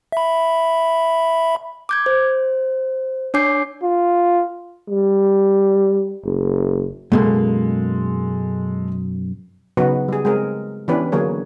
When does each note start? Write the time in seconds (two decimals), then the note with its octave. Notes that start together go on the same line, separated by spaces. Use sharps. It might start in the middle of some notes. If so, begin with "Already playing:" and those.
0.12 E5 B5
1.89 D6 G6 G#6
2.06 C5
3.34 D4 C#5 G#5 D6 G6 C7
3.83 F4
4.89 G3
6.24 F#1
7.12 F#2 B2 G#3 A#3 A4
9.77 C#3 F#3 B3 D#4 F#4 B4
10.08 G3 G#4
10.25 G#3 C4 G#4 A#4
10.88 E3 B3 C#4 D4 G4 B4
11.12 D3 F#3 A#3 G#4 C#5